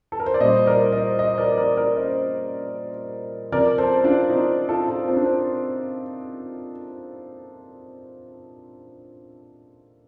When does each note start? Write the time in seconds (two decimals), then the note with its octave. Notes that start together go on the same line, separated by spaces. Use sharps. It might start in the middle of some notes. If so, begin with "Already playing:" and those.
0.12 A4
0.20 A#4
0.26 C5
0.34 D5
0.40 A#2 G3 C5 D#5
0.67 A#4 D5
0.92 C5 D#5
1.18 C5 D#5
1.38 A#4 D5
1.57 A#4 D5
1.77 A#4 D5
1.97 C5 D#5
3.52 C3 F3 A#4 D5
3.78 A4 C5
4.04 D4 F4
4.30 C4 D#4
4.69 F4 A4
4.88 F4 A4
5.08 C4
5.17 D4
5.26 C4